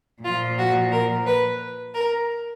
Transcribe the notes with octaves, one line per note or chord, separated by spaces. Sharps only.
A#2 F3 F4
F#4
A#4
B4
A#4